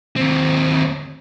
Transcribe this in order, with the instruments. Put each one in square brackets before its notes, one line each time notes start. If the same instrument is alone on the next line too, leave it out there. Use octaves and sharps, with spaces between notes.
[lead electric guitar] D#2 C4